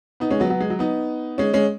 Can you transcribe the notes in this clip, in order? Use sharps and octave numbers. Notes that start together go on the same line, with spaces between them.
B3 D#4
G#3 C#4
F#3 B3
F#3 B3
G#3
F#3
B3 D#4
G#3 C#4
G#3 C#4